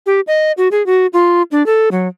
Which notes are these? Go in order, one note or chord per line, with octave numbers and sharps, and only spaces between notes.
G4
D#5
F#4
G#4
F#4
F4
D4
A4
F#3